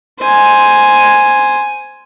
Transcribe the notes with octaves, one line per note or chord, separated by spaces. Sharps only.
C5 G#5